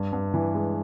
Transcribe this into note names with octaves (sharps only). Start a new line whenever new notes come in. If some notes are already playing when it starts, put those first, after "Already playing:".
Already playing: G2
G2
E3
G#3